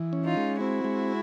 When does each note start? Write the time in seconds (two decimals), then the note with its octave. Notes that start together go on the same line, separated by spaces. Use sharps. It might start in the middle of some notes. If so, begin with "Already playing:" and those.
Already playing: E3
0.13 C#4
0.25 D#4 F4
0.37 G#3
0.60 C4 E4 F#4
0.84 G#3